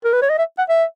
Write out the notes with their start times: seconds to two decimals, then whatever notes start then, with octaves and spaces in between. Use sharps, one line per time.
0.04 A#4
0.13 B4
0.22 C#5
0.30 D#5
0.38 E5
0.58 F#5
0.69 E5